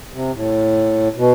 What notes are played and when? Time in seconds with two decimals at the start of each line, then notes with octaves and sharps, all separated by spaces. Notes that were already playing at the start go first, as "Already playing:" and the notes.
0.13 C3
0.33 A2
1.16 B2